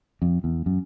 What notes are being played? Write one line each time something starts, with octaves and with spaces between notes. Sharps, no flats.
F2
E2
F#2